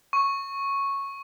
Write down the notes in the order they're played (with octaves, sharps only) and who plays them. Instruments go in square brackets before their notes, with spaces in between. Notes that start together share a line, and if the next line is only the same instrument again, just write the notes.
[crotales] C#6